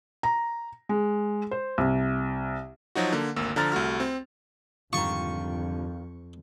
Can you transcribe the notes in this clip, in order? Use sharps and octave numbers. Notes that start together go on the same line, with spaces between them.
A#5
G#3
C5
C2
F3 F#3 D#4 F#4
D3 A#3
G#1 D2 A#3 E6
D3 F3 A#5 F6 A6
C2 A3 F#4 F6
C4
F2 G#2 D3 D#3 G3 F4 C#6